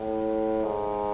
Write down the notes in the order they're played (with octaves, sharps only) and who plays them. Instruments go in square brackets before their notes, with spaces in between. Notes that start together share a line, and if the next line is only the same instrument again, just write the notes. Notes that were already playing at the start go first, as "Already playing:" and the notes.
Already playing: [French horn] A2
G#2